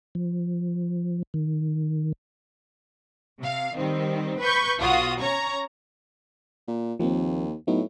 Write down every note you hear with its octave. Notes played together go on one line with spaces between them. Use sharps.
F3
D#3
C3 F5
D#3 G3 C4
B4 B5 C#6 G6
B1 F4 F#4 D#6
C#4 C#5 A#5 C#6
A#2
D#2 F3 A#3 C4
A2 F#3 B3 D#4